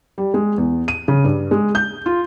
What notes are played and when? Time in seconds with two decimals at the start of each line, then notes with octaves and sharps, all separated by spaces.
0.18 G3
0.34 G#3
0.58 E2
0.88 D#7
1.08 C#3
1.24 G2
1.51 G#3
1.75 G6
2.06 F4